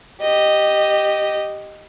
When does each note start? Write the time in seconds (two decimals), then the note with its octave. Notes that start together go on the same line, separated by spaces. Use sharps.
0.21 G4 D#5